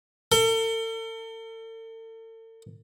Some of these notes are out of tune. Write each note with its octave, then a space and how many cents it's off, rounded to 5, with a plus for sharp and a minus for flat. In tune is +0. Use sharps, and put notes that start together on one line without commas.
A4 +40